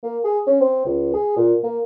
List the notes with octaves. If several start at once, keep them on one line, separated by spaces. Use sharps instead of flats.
A#3
G#4
C#4
C4
C#2
G#4
A#2
A#3